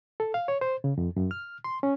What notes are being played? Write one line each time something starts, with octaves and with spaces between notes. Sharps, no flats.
A4
F5
C#5
C5
C#3
F2
F#2
F6
C6
C#4